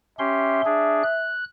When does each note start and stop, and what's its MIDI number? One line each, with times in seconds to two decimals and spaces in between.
0.19 0.61 61
0.19 0.61 67
0.19 1.34 76
0.19 0.61 84
0.65 1.03 62
0.65 1.03 68
1.03 1.44 90